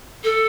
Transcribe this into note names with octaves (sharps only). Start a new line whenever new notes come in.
A4